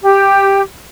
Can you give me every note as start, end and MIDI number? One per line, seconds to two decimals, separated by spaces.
0.03 0.60 67